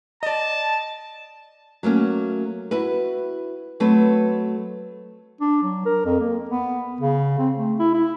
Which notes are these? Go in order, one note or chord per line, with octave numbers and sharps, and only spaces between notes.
D5 D#5 A5
F#3 A3 A#3 C#4
E4 F#4 B4
F#3 A3 C4 B4
D4
F#3
A#4
F2
A#3
B3
C#3
C4
A3
E4
E4